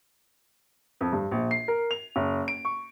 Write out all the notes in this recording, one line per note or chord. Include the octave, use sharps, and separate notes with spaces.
F2
G2
A#1
C7
A#4
F7
F#1
D7
C#6